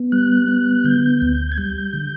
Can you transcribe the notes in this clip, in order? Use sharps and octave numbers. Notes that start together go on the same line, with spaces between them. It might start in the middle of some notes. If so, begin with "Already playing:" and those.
Already playing: B3
G3 F#6
B3
D3 G6
D2
G#6
G3 G6
D3